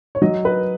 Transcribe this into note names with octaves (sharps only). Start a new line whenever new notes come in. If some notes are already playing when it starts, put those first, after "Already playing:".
C#5
F#3 D#5
B4